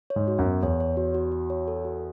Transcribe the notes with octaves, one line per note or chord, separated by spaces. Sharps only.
C#5
G#2
F#4
F#2
B3
E2 C#5
C#5
F#4
F#4
F#4
C#5
A4
F#4